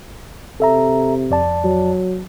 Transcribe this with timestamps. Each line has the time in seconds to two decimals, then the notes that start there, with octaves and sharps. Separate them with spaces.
0.60 C3 A4 E5 A#5
1.31 F2 D5 A5
1.65 F#3